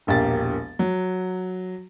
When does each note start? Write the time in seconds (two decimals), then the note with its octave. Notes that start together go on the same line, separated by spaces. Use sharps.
0.07 E1 A#1 A#3 G4 A6
0.79 F#3